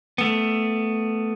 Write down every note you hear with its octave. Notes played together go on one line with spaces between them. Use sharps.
A3 B3